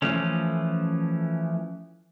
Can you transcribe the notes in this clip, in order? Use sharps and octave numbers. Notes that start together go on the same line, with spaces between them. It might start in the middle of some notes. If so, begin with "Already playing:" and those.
E3 F3 A3 C#4